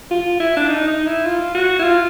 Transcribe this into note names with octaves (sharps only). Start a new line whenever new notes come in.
F4
E4
D4
D#4
D#4
E4
F4
F#4
E4
F4